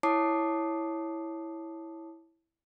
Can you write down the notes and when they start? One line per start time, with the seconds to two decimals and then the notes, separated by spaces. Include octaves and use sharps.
0.03 E4 C#5 A5 D6 D#6 C7